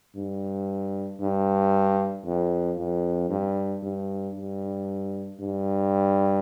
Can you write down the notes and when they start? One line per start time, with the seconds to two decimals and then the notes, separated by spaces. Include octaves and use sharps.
0.16 G2
1.21 G2
2.25 F2
2.78 F2
3.30 G2
3.83 G2
4.35 G2
5.40 G2